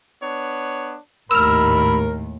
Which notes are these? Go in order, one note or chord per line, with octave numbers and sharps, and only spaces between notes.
B3 D4 C#5
G#1 D#2 A2 A#4 B5 E6 F6